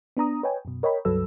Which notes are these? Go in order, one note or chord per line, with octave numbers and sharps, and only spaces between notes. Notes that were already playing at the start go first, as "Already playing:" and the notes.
B3 D4 A#5 D#6
B4 C#5 D#5 G5 G#5
F#2 B2
A#4 C#5 D#5 G5 B5
C#2 G2 F#3 A4 B4 E6